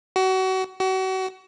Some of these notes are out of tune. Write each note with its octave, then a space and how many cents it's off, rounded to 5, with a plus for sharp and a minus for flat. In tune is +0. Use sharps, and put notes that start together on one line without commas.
F#4 +30
F#4 +35